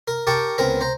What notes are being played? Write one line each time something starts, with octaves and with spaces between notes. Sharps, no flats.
A#4
G4 A#4 G5 A5 C#6
C#2 B3 C4 A#4 A#5
C5 A#5